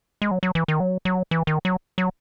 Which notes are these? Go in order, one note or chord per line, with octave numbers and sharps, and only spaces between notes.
G#3
F#3
F#3
E3
D#3
F#3
F#3
E3
D#3
F#3
F#3